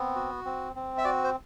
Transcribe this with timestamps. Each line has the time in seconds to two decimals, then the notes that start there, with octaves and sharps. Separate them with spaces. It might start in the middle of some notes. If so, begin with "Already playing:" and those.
Already playing: B3 C4
0.15 F#4
0.45 C4
0.76 C4
0.98 E5
1.04 F#4 D5
1.24 C5